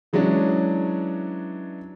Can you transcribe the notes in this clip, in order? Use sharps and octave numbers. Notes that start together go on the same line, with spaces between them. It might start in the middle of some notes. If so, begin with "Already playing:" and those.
E3 F#3 G#3 C#4 D4